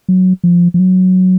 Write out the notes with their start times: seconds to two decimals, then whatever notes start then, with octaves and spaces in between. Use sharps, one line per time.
0.09 F#3
0.44 F3
0.74 F3
0.79 F#3